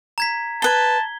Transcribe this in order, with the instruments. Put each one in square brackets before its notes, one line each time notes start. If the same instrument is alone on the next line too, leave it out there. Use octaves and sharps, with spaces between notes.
[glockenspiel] A#5 G#6 B6
[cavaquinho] B4 B5 [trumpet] A5 [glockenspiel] G#6 G7